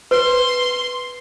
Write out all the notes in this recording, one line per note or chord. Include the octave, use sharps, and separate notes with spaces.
B4 C6